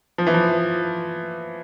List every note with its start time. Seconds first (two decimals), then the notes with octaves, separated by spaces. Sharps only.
0.18 F3
0.27 E3
0.34 F3